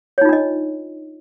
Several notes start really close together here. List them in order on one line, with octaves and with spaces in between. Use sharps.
C#5 D#4 F4 D4 D#5